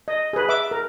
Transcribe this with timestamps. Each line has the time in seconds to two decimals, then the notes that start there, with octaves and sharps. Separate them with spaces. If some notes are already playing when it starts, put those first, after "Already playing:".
0.08 D#5
0.33 G#4 B4
0.49 E5 D6
0.71 A#4